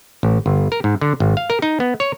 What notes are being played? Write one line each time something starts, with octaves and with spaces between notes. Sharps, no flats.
A1
G1
A#4
G#2
D3
G#1
F5
A#4
D#4
B3
C#5